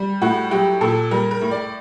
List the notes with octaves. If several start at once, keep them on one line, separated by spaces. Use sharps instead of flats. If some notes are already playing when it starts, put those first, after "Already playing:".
Already playing: G3
A2 F#4
F#3 G4
A#2 A4
G3 A#4
A#4
A2
D5